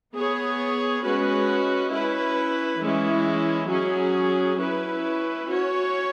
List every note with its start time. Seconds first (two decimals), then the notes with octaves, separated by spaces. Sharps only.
0.13 B3 G#4 C#5
1.02 G#3 C#4 F#4 B4
1.91 C#4 E4 B4
2.80 E3 G#3 C#4 E4
3.69 F#3 C#4 G#4
4.58 C#4 E4 B4
5.47 C#4 F#4 C#5